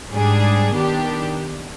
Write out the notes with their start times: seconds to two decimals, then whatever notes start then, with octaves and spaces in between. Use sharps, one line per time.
0.11 G#2 G3 D4 G#4
0.74 D#3 B3 D4 G4